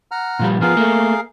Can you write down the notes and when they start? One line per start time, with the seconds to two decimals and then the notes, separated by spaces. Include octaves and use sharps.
0.11 F#5 A#5 F6
0.39 A#2 F3 G3
0.61 F3 B3 G#4 A#4 F5
0.77 A3 A#3